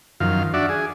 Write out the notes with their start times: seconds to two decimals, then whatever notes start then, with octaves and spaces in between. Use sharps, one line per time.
0.20 F#2 D#3 F3 F5
0.54 D4 F#4 D5 E5
0.69 G#4